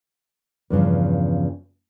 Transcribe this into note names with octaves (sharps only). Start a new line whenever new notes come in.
E2 G2 C#3 F3